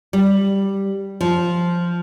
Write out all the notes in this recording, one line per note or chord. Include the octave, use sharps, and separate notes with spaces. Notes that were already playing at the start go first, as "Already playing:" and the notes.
G3
F3